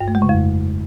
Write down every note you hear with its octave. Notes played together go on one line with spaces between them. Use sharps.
G2
A3
G#3
C#3
F2